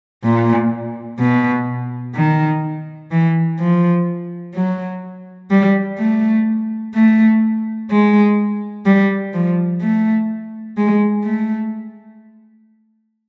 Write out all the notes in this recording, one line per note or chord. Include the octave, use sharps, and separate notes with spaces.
A#2
B2
D#3
E3
F3
F#3
G3
A3
A3
G#3
G3
F3
A3
G#3
A3